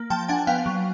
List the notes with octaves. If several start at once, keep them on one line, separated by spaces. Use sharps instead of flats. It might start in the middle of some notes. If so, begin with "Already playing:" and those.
Already playing: A#3
F3 G5 A5
D4 F#5 G#5
B3 F5 G5
F#3